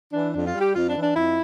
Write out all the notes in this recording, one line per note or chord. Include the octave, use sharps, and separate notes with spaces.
E3 D4
F2 D4
F4
G3
G4
F2 F4
D4
E3
D4
F2 E4